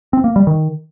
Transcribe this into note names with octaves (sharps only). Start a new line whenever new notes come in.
C4
A#3
G3
D#3